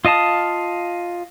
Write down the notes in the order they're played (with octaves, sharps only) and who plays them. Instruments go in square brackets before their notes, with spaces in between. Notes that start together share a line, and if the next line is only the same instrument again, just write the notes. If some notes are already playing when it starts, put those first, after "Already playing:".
[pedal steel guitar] F4 D#5 F5 A5 D#6